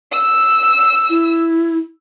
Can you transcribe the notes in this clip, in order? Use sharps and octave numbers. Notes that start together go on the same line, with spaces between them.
E6
E4